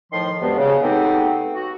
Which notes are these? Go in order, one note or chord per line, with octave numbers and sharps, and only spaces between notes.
A2 D#3 F3 C6
G2 C3 G#3 B3 D4 F#4
C#3
A3 B3 C4 D#4 G4 A4
F#4